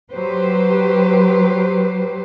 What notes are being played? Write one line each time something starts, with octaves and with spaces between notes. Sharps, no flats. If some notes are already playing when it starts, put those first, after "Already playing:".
F#3 G4 B4 C5